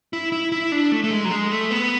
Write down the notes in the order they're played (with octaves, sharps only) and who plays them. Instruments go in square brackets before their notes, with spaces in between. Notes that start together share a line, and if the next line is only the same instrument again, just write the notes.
[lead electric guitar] E4
E4
E4
D4
A3
A3
G#3
F#3
G#3
A3
B3